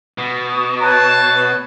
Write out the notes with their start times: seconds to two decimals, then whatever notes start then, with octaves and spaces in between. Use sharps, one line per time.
0.18 B2
0.82 B4 C#5 A5